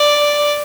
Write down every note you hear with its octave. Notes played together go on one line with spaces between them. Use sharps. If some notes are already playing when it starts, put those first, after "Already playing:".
Already playing: D5